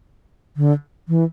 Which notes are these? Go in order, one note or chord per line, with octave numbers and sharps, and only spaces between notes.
D3
E3